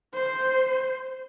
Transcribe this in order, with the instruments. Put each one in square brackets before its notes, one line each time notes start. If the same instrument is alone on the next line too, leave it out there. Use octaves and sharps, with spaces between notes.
[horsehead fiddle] C5